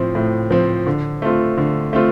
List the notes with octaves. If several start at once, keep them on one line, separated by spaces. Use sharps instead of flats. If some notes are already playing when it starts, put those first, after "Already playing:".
Already playing: A2 F3 C4
A2
F3 C4
D3
A3 C4 F4
D3
A3 C4 F4